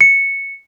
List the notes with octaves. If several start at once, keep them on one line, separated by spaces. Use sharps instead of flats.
C#7